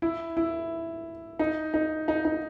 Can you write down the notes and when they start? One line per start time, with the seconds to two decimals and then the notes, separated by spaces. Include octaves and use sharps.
0.02 E4
0.37 E4
1.39 D#4
1.74 D#4
2.08 D#4
2.25 D#4